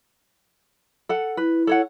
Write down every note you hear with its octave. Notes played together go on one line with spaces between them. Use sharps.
A4 F#5
E4 B4
A4 C#5 F#5